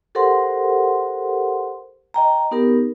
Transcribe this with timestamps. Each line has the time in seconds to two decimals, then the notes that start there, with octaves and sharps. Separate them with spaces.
0.15 G4 A4 A#4 C5 F#5 C6
2.14 D#5 G5 A#5
2.51 B3 D#4 G4 A#4